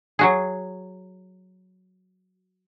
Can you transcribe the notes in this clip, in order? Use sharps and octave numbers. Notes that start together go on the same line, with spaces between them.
F#3 F#4 G#4